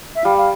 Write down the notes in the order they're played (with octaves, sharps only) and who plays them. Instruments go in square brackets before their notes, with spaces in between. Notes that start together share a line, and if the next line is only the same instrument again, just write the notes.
[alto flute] E5
[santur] G3 [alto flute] F5
[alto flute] F5